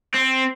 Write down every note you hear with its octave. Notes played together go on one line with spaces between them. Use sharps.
C4